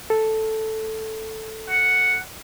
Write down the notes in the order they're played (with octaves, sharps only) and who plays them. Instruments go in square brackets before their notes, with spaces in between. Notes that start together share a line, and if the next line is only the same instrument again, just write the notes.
[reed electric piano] A4
[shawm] F#5